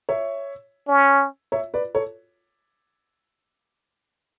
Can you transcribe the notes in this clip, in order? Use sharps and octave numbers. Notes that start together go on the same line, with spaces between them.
C#5 E5
C#4
C#5 E5
B4 D5
A4 C#5